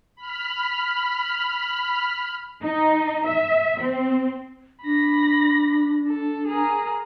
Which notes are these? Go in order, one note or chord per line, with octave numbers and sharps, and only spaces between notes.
B5 F6
D#4
E5
C4
D4 B5 A#6
A4
G#4 A#4